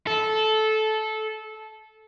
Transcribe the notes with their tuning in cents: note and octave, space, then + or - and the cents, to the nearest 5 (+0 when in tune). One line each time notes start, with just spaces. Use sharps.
A4 -15